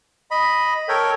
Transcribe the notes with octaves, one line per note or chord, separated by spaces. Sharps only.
D#5 B5
A4 A#4 C#5 G5